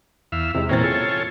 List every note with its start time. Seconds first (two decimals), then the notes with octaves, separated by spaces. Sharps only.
0.32 E2 E5 F5
0.54 C3 G#3 E4
0.69 A#2 E3 A#3 C4 C#4 A6
0.84 F4 G#4 A4 C#5